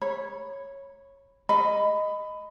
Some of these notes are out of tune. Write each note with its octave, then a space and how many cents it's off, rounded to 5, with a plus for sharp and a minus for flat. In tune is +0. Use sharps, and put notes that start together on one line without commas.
C#5 -10 B5 +0
D#5 +0 B5 +20